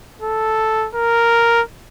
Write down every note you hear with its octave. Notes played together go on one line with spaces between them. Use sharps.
A4
A#4